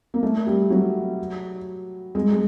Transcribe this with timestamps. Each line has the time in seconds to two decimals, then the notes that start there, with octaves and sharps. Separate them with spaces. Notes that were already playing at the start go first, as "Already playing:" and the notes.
0.14 A#3
0.23 A3
0.47 G3
0.70 F#3
2.15 G#3
2.32 G#3